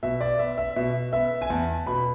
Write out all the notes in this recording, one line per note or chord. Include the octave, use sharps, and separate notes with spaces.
B2 E5
D5
B3 E5
E5
B2 E5
B3 E5
G#5
E2 A5
B2 B3 B5